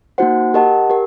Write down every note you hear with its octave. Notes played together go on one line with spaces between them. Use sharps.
A#3 D#4 F#4 C5 F#5
G4 A#4 D#5 F#5 A5
G4 A#4